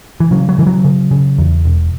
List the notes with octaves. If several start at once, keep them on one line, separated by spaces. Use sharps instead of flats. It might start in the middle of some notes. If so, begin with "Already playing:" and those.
E3
C#3 F#3
F#3
C#3 E3
F#3
C#3
C#3
E2
E1